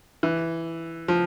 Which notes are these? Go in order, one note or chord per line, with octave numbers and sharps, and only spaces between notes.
E3
F3